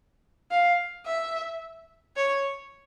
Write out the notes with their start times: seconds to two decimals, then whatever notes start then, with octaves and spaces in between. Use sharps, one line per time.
0.51 F5
1.06 E5
2.16 C#5